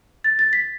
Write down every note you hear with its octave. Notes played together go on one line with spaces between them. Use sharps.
A6
A6
B6